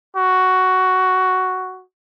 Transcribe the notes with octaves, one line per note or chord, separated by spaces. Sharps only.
F#4